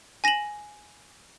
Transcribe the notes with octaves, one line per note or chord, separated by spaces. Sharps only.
G#5 A#6 D#7 E7 F#7